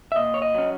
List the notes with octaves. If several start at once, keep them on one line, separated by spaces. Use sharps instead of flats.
E5
A#2 D#5
C#5
D#5
F#3 C#4